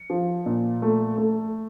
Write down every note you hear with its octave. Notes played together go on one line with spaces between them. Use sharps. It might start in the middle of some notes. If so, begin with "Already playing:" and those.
Already playing: C#7
F3
A#2
A3
A3